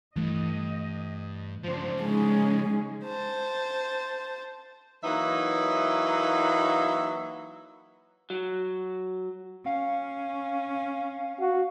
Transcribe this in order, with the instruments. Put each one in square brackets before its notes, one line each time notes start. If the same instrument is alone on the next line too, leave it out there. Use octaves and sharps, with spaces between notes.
[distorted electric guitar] G2 [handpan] E3 A3 [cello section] D#5
[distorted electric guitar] C#3 F3 [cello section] D4 C5
[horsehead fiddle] G#3 [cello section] C#4 D#4 G#4
[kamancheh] C5 A5
[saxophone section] E3 F#3 A#3 D#4 B4 E5
[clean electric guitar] F#3
[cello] C#4 [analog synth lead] F5
[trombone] F#4